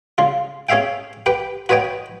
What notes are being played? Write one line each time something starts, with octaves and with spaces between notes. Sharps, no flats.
C#3 F4
C#4 G#4 C#5 E5 F5 G5
G4 B4 G5
F#4 B4 C#5 D#5 G5